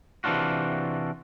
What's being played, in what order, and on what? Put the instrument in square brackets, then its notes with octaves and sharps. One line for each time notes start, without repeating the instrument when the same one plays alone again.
[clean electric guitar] C3 E3 G3 D4 F4 F#4